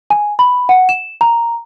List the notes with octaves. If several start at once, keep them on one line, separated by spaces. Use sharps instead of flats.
G#5
B5
F#5
E7
A#5